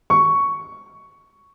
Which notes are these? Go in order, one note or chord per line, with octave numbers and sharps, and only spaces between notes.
C#6